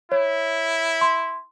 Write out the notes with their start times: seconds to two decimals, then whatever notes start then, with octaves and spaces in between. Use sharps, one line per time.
0.12 E4 C#5
1.01 C6